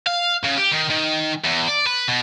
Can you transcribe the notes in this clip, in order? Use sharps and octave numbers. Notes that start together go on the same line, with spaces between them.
F5
C#3
G4
D#3
D#3
E2
D5
B4
B2